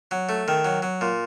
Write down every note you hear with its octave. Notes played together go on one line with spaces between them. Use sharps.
F#3
A3
D#3
F#3
F#3
A#2